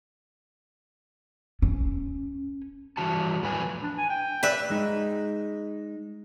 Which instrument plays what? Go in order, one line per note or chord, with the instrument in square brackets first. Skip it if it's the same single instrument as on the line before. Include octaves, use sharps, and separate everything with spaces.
[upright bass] C#4
[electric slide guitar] G2 E3 F#4 A5
E2 A2 F3 F#3 B4 G#5
[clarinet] D4
G#5
G5
[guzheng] B4 E5 [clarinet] D5
[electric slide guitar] G#3 D#4